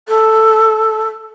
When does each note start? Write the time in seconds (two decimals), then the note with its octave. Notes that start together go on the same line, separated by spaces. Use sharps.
0.08 A4